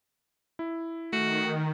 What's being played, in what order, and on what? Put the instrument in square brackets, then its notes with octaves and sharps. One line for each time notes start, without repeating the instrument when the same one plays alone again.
[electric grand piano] E4
[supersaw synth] D#3 [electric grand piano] A3 [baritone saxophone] F#4